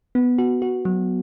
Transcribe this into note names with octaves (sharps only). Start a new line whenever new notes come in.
B3
F#4
F#4
F#3